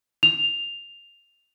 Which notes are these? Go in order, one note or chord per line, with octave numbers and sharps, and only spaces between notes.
F7